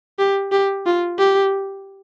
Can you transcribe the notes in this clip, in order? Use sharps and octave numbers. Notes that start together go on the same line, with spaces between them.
G4
G4
F4
G4